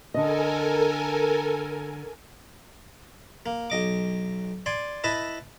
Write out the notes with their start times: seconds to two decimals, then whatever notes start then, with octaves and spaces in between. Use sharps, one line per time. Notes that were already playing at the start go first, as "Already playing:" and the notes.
0.14 D3 A4 A#4 D#5 G#5
3.46 A#3
3.70 B1 D#5 D6
4.66 D5 G#5 C6
5.04 E4 B4 D#5 E5 A5